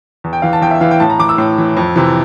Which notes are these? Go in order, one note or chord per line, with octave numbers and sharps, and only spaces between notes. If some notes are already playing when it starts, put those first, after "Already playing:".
E2
G5
E3 F5
A5
E2 G5
E5
E3 F5
G5
A2 A5
A#5
E3 D6
E6
A2
E3
F2
C3 E3